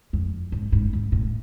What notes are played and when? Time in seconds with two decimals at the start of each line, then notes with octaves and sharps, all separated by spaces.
0.13 F2
0.52 G#2
0.72 G#2
0.93 G#2
1.12 A2